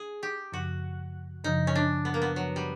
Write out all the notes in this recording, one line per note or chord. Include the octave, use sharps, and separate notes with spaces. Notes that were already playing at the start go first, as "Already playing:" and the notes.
Already playing: G#4
G4
F#2 C#3 F3 F#4
F#2 C#3 F3 D#4
C#4
D4
B3
A#3
B3
F#2 C#3 F3 F#3
G3